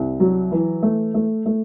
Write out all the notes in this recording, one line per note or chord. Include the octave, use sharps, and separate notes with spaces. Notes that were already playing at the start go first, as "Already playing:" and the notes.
Already playing: C2
F#3
E3
A3
A3
A3